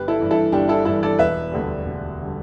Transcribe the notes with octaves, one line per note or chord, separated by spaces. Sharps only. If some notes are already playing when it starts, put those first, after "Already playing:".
Already playing: G1 G4 B4
E4 A4
G2 E3
E4 A4
G1 D4 G4
E4 A4
G2 E3 E4 A4
A4 D5
E1 B4 E5
D2 D3 G3
E1
D3 G3